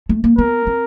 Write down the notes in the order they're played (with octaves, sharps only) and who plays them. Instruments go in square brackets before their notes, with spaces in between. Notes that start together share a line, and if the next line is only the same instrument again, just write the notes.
[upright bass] A3
A#3
[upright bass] B3 [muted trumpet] A#4
[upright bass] C4